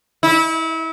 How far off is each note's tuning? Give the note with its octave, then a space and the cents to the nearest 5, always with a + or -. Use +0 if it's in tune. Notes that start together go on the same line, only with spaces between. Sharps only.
E4 -30